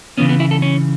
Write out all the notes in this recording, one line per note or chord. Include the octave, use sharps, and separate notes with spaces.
C#3 E3 B3 C#4
B3
E4
A4
C#4